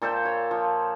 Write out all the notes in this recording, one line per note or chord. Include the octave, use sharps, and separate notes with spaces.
A#2 A4 C5 G5
C#5
F3